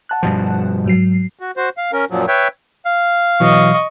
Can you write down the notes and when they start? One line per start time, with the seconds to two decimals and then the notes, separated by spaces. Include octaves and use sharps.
0.09 F#5 A5 F#6
0.23 G2 B2 F3
0.86 G#2 F#3 C7
1.39 F#4
1.57 F#4 C5
1.77 F5
1.93 C#4 A#4
2.10 F#2 A#2 F3 F#3
2.28 B4 C#5 E5 G5
2.86 F5
3.40 B2 E3 F#3 D#5 C#6